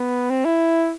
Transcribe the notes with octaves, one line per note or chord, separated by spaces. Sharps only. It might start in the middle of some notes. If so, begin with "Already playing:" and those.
Already playing: B3
C4
E4